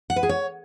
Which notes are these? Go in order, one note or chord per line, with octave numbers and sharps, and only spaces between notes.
F#5
B4
G#4
C#5